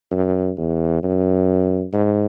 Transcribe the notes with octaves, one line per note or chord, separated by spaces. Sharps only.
F#2
E2
F#2
G#2